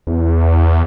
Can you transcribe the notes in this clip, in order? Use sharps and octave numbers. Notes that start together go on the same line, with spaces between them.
E2